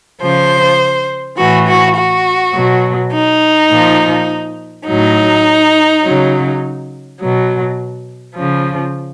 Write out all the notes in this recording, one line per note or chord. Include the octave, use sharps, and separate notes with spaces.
C#3 F3 C5
A2 E3 F#4
F#4
F#4
B2 F#3
D#4
A#2 F3
A2 F#3 D#4
C#3 F#3
B2 F#3
C#3 F3